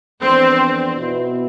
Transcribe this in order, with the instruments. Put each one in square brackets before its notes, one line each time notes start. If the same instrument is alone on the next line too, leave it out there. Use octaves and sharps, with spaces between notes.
[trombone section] F2 E3 B3 D4 [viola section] C4
[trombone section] B2 B3 E4